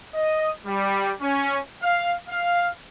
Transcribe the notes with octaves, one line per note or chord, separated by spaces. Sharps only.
D#5
G3
C#4
F5
F5